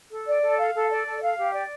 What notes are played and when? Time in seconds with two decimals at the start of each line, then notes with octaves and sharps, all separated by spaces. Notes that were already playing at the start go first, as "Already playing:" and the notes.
0.11 A4
0.27 D5
0.42 A4
0.59 F5
0.74 A4
0.90 D5
1.06 A4
1.22 F5
1.38 G4
1.53 D5